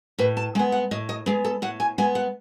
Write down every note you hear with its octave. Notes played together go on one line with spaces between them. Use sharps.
A2 B4
A5
G#3 B3 G#5
F#5
A2 D#5
D#5
G#3 B3 G#4
A4
A2 F#5
G#5
G#3 B3 G#5
F#5